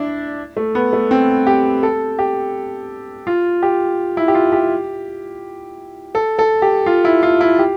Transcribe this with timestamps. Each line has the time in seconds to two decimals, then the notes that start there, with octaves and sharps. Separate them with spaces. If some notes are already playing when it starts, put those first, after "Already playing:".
Already playing: D4 E4
0.57 A3
0.75 B3
0.93 A3
1.11 C4
1.47 G4
1.83 A4
2.19 G4
3.27 F4
3.63 G4
4.17 E4
4.28 G4
4.35 F4
4.52 G4
6.15 A4
6.39 A4
6.62 G4
6.86 F4
7.05 E4
7.23 F4
7.41 E4
7.59 G4